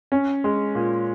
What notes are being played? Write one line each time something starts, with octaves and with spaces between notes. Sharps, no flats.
C#4
G#3
A#2